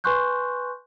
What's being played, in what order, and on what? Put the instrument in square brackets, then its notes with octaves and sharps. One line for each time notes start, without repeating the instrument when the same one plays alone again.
[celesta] B4 G#5 C6 C#6 F#6 G6